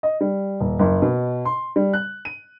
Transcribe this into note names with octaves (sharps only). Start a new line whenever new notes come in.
D#5
G3
D#1
F#1
B2
C6
G3
F#6
D#7